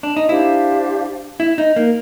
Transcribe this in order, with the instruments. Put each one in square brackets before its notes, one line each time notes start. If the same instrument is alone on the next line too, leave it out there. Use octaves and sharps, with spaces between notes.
[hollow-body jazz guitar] D4
D#4
[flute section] D4 G4 C5 F5 [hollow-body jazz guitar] E4
[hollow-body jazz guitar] E4
D#4
A#3